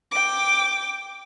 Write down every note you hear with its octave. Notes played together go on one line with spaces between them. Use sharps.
G5 D6